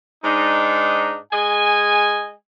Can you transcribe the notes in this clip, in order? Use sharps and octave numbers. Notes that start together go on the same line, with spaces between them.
G#2 D4 D#4
G#3 D#5 G#5